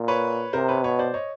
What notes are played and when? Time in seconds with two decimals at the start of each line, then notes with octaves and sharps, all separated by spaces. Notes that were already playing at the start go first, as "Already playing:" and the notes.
Already playing: A#2
0.08 B4 C#5
0.53 C3 A#4 C5
0.69 B4 C#5
0.84 B2 B4 C#5
0.99 C5 D5
1.14 C#5 D#5